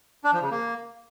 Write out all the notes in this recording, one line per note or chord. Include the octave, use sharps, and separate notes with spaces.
D4
F3
C#3
A#3